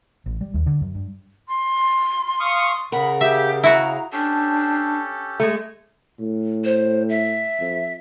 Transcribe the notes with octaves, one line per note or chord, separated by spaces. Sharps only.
A1
G3
D#2
D3
F#2
G2
C6
F5 C#6 D#6
C#3 A#4 F#5 B5
G4 E5
E4 F#4 A#5
C#4 D4 G4 A4
G#3 A3
A2
C5
E5
F2